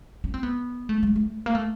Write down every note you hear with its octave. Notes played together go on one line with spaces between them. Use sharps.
C#4
C4
B3
A3
G#3
A3
A#3
A3